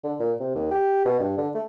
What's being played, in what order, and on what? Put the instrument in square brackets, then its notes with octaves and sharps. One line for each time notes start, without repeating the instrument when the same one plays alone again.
[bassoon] D3
A#2
C3
D#2
G4
B2
G2
D3
A3